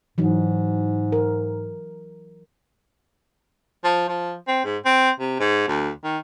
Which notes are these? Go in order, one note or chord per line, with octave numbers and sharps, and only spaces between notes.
G#2 E3 F#3 D#4
A#4
F3
F3
C4
G#2
C4
C3
G#2
D2
D#3